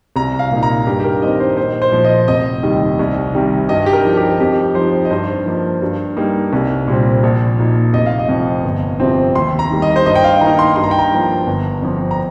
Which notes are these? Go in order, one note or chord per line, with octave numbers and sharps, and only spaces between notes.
C2 A#5
F5
A#2 A#3 D#4
A#5
G2 G4
G4
A#4
D#3 C4 D#4 D#5
C5
A#1 C5
C5
A#2 F3
D#5
F1 D#5
D#2 D#3 G3
C2
C3 D#3 G3
G2 D#5
G4
A#4
F3 D#4
G4
F2 G4
F3 D#4 C5
D#5
G2 C5
F3 A#3
G2
G3 A#3 D#4
C2
A#2 G3 C4
A#1
A#2 A#3 D#4
F1 D#5
F5
D#5
F2 F3
G1
F2 C3 F3 C4
D#2 C6
A#5
D#3 G3 A#3
D#5
C5
G2 D#5
G5
F5
D#3 A#3 D#4 A#5
C6
G2 C6
A#5
G5
A#5
F3 A#3
G1
F2 F3 C4
A#5